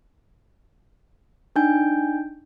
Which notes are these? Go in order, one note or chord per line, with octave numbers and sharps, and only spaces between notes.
D4 D#4 G5 G#5 G6